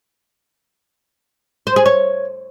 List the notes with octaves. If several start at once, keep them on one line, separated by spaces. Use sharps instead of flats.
C5
G#4
C#5